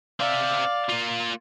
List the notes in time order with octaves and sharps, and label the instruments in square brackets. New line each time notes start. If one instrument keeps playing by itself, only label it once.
[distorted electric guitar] C4 E5 [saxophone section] D5 F5
[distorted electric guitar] A#3 F4